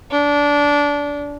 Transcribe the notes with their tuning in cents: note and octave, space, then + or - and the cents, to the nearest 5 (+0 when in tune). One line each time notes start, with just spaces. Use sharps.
D4 -20